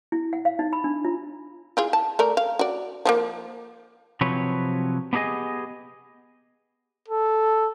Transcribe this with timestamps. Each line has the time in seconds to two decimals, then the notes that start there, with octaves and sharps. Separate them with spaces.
0.12 E4
0.33 F#5
0.45 F5
0.59 D#4
0.73 B5
0.84 D4
1.05 F4
1.77 E4 F4 G#4
1.93 A5
2.19 A3 A#4 D5
2.37 F5
2.59 F#4 D5
3.05 F3 F#3 A#3
4.21 C3 F3 F#3 C4 B4 C#5
5.13 B3 D4 G4 G#4 D#5 G#5
7.08 A4